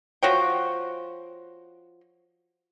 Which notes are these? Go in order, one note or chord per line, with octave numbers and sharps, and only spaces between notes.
F3 F#4 C#5 G5